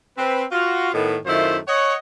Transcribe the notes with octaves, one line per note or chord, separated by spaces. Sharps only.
C4 B4
F4 F#4
A2 D#3 B3
F#2 D#3 A3 E4 F4 C5
C#5 D#5 F#5